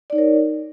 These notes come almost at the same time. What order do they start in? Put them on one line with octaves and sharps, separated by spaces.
D5 D#4 C#5 A#4